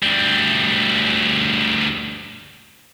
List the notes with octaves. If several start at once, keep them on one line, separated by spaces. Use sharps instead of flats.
D2 G3